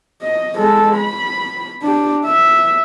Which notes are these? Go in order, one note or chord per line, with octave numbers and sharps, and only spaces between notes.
D#5
G#3 A4
B5
D4 G4
E5